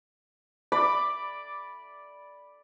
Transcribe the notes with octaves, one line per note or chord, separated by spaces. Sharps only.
D5 B5 D6